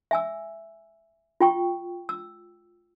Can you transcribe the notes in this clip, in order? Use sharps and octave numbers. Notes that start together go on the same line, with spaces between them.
E5 G#5 E6
F4 G5 C#6
E6